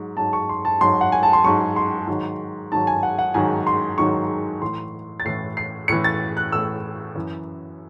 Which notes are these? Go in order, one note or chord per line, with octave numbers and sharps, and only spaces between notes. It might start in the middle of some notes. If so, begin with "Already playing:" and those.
Already playing: G#2 F#3
G#2 F#3 A5
C#6
C6
A5
G#2 F#3 C6
F#5
G#5
A5
C6
G#2 F#3 C#6
C6
G#2 D#3 F#3
G#2 D#3 F#3 A5
G#5
F#5
F#5
G#2 D#3 F#3 G#5
C6
G#2 D#3 F#3 C#6
A2 E3 C6
A6
A2 E3 C7
C7
A2 E3 C#7
A6
F#6
A2 E3 E6
F#2 E3